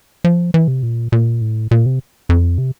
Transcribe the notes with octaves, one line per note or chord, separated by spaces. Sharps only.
F3
E3
C3
A#2
A#2
A2
A#2
C3
F2
C3